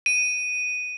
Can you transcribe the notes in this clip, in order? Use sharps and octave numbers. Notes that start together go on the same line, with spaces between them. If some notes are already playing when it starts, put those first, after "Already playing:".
D#7